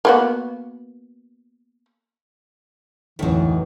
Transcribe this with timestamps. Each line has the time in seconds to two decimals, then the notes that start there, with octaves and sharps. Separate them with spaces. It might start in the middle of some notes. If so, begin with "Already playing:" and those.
0.05 A#3 B3 F#4
3.19 D1 A1 F2 D#3 E3 F#3